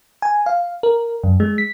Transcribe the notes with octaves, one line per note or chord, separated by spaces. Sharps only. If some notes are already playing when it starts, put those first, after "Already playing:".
G#5
F5
A#4
F#2
G#3
B6